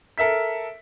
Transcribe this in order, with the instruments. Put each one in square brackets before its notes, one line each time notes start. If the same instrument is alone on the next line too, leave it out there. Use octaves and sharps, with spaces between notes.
[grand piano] A4 A#4 E5 B6